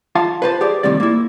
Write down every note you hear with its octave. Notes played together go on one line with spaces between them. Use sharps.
F4 F5 A5
B4 C5 A5
G4 G#4 D5
D#2 A2 C3 G3 D5
A#3 E4